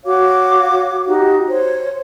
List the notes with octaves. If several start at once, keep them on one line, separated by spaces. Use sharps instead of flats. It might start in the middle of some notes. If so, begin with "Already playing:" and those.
F#4 C#5 F5 D6
D#4 F#4 G4
C5 C#5